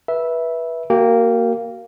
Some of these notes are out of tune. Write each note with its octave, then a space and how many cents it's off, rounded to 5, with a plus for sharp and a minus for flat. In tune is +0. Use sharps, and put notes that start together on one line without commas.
B4 -20 E5 -5
A#3 -10 F#4 +30 G5 +0